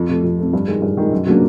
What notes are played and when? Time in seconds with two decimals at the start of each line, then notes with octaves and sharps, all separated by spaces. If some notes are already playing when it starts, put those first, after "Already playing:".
Already playing: F2
0.09 C3 F3 A3
0.24 F2
0.39 C3 F3 A3
0.53 G2
0.68 D#3 G#3
0.82 G2
0.97 D#3 G#3
1.12 F#2
1.26 C#3 F#3 A#3 D4